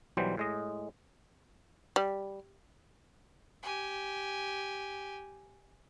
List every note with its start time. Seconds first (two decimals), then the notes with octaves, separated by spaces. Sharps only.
0.17 B1 E3 F#3 G3 C5
0.37 A2 G#3 D#5
1.96 G3
3.63 G4 G#5